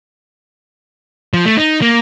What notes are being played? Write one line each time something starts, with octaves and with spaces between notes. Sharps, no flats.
F3
A3
D#4
A#3